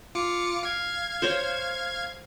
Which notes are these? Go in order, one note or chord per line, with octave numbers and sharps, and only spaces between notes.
F4 D6 C#7
F5 G#6
C5 C#5